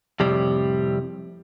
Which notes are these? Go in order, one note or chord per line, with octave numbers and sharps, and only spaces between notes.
F2 A2 C3 G3